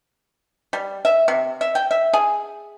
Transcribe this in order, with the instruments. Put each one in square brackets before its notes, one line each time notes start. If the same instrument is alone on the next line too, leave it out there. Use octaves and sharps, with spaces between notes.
[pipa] G3
E5
C3
E5
G5
E5
G#4